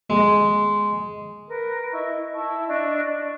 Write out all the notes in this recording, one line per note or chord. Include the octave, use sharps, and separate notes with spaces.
G#3
A#4 B4
E4 D#5 C#6
E4 A5 C#6
D4 D#5 C#6
D4